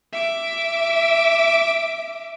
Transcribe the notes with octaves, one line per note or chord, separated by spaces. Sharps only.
E5 D6